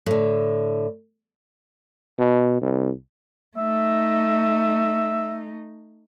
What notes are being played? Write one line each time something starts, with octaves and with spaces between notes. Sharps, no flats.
A2 D3
B2
C2
A3 D#4 E5